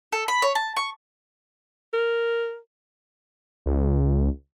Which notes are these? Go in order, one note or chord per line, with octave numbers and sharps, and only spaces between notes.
A4
B5
C#5
A5
C#6
A#4
C#2